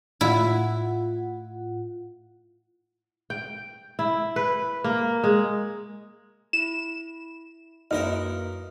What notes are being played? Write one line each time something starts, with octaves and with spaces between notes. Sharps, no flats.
A2 E4 F4 F#5
G5
E4
B4
A#3
G#3
E4 E7
F#2 A#3 D#4 E4 A#4 B4 F6